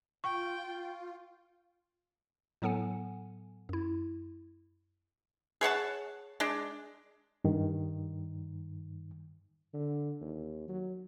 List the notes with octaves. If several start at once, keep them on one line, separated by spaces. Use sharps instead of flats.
F4 G5 C#6
A2 F#3 B3 A4 F#5 G#5
F#2 E4
G#4 C#5 F#5 A5
G#3 D4
G2 D#3
D3
D#2
F#3